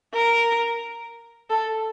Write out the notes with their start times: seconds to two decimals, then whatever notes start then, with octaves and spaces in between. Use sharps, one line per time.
0.14 A#4
1.50 A4